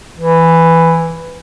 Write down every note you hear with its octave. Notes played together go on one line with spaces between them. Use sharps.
E3